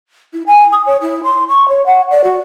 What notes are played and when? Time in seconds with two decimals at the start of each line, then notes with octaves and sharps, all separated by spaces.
0.33 E4
0.47 G#5
0.72 D#6
0.86 C#5
1.02 E4
1.24 C6
1.49 C#6
1.68 C#5
1.86 F#5
2.11 D5
2.24 F#4